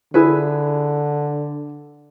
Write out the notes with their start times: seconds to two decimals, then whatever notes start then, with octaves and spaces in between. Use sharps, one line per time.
0.14 D3 E4 G#4 B4